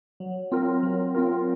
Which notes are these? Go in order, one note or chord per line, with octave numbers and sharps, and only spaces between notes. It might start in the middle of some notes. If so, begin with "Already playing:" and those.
F#3
C4 F4 A#4
F#3
C4 F4 A#4